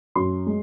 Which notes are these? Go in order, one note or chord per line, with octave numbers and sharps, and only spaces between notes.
F#2 C6
G#3